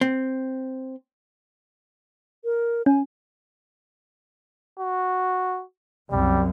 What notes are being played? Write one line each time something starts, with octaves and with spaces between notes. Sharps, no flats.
C4
A#4
C#4 G#5
F#4
C2 F#2 G3